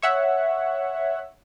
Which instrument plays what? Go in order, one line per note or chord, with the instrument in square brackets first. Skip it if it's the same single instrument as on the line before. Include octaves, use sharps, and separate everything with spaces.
[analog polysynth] C#5 E5 F#5